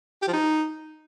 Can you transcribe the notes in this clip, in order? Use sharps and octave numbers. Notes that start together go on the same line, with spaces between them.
G4
F3
D#4